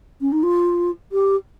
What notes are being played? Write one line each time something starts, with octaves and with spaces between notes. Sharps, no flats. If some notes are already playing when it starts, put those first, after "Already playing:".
C#4
D#4
F4
G4